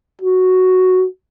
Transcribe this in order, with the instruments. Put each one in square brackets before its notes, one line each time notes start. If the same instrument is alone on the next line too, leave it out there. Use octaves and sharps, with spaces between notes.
[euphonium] F#4